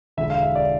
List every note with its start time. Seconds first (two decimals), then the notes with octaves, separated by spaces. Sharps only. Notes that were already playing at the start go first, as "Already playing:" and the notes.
0.17 E1 E2 D3 E5
0.30 F5
0.42 E5
0.55 D5